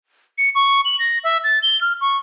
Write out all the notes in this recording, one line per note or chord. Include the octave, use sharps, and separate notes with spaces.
C#7
C#6
F#7
A#6
E5
A6
G7
F6
C#6